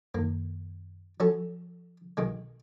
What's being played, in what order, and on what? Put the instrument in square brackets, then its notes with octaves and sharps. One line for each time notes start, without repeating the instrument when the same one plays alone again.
[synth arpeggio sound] F#2 D#3 [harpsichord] A#3
[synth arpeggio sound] F3 [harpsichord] F#3 C#4 A4
[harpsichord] B1 D#3 G#3